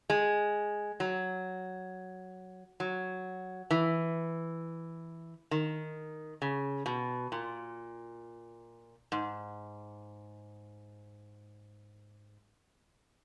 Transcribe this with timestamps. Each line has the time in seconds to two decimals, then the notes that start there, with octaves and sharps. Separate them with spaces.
0.10 G#3
1.00 F#3
2.80 F#3
3.71 E3
5.51 D#3
6.42 C#3
6.86 B2
7.32 A#2
9.12 G#2